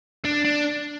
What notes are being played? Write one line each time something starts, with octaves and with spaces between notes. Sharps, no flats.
D4
D4